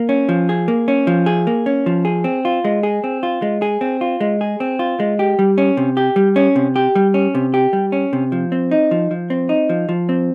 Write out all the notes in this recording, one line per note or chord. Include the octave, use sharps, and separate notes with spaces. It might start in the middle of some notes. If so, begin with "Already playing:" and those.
Already playing: A#3
C#4
F3
G#4
A#3
C#4
F3
G#4
A#3
C#4
F3
G#4
C4
F4
G#3
G#4
C4
F4
G#3
G#4
C4
F4
G#3
G#4
C4
F4
G#3
G4
G3
C#4
C3
G4
G3
C#4
C3
G4
G3
C#4
C3
G4
G3
C#4
C3
F3
C4
D#4
F3
F3
C4
D#4
F3
F3
C4